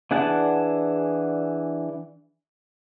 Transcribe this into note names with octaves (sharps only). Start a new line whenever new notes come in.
E3 D4 G#4 F#5 A5